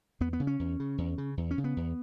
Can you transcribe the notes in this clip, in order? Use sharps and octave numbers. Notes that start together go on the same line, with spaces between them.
E2 B3
B3
C#3
C#4
E2
C#3
E2
C#3
E2
C#4
C#3
B3
E2